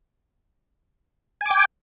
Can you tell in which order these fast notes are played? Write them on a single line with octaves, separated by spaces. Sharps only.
G#5 D6 G5